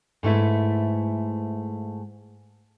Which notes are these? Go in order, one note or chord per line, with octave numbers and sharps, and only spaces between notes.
G#2 A3 E4 B4